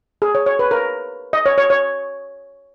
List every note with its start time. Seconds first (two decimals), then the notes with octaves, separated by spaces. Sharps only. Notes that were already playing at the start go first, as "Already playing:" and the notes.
0.22 G#4
0.35 C#5
0.46 C#5
0.59 B4
0.71 A#4
1.33 D#5
1.46 C#5
1.58 C#5
1.70 C#5